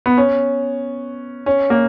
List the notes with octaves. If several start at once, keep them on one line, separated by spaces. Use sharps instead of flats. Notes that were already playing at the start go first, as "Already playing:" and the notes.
B3
C#4
C#4
A#3